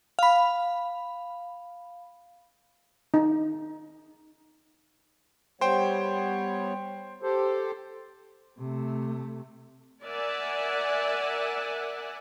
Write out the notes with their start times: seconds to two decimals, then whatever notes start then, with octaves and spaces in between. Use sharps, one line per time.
0.19 F5 B5
3.14 D#4
5.61 G3 B3 C5 C#5 G5
7.22 G4 A4 C5
8.58 C3 A3
10.02 A#4 D5 E5 F#5 G#5